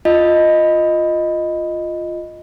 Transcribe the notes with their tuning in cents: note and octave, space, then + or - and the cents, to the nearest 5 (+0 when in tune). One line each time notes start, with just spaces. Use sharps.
F4 +0 D#5 +0